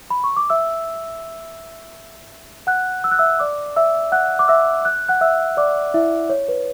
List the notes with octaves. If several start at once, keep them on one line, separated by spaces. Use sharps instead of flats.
B5
C#6
D6
E5 E6
F#5 F#6
E6
F#6
E5 E6
D5 D6
E5 E6
F#5 F#6
D6
E5 E6
F#6
F#5 F#6
E5 E6
D5 D6
E4 E5
C#5
B4